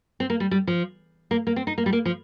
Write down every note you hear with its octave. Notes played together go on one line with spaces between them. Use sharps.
C4
A#3
G3
G3
F3
A#3
A#3
C4
D#4
A#3
G3
A#3
F3